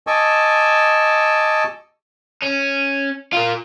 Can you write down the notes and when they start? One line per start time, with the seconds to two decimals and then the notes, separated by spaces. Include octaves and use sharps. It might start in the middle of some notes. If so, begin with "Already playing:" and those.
0.07 D#5 G#5 A5 C#6 D6 E6
2.43 C#4
3.33 F4 A#4